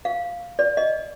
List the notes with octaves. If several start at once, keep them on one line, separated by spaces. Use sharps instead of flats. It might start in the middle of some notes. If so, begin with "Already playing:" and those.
F5
D5
D#5